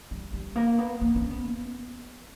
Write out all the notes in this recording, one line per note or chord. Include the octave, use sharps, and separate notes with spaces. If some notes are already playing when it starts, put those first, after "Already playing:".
G3
G3
A#3
B3
A#3
C#4
B3